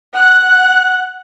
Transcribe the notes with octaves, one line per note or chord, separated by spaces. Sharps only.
F#5 F#6